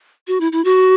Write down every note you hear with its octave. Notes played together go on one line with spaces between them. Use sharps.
F#4
E4
E4
F#4